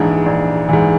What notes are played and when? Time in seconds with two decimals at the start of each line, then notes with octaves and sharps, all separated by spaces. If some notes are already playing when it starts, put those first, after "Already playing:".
Already playing: A#1 G#2 E3 D4 D#4
0.26 A#1
0.69 G#2 E3